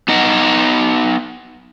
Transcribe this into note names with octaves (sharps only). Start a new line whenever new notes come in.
B3 D#4 D#5 F#5